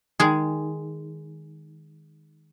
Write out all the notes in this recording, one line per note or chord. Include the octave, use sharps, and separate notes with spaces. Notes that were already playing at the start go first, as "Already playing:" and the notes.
D#3 G#3 G#4